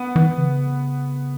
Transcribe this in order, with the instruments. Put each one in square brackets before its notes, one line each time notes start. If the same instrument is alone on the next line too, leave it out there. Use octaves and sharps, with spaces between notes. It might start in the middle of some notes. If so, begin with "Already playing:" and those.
Already playing: [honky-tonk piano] B3
[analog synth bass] E3
C#3